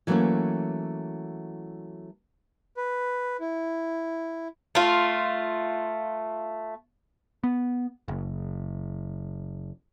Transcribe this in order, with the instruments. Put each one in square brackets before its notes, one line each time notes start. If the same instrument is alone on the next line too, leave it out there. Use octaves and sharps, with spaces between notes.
[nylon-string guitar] E3 F#3 G3 A3 A#3 C#4
[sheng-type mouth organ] B4
E4
[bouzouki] A3 F4
[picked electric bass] B3
F#1